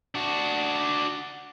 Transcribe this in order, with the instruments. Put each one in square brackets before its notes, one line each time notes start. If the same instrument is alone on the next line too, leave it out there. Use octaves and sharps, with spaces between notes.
[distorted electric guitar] D4 F#4